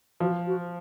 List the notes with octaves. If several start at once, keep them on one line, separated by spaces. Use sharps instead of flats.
F3 F#4
F#4